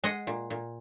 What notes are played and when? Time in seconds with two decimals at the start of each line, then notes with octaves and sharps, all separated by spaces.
0.04 G#3 D#5 F#5
0.27 A#2
0.50 A#2